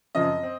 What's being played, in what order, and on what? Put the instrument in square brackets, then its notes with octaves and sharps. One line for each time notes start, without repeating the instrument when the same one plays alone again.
[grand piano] F#2 C#3 F3 C4 D#5
C4